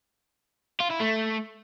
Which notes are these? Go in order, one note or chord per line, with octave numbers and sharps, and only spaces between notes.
F4
E4
A3